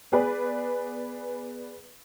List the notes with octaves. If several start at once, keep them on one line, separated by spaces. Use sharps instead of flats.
B3 G#4 B4 D5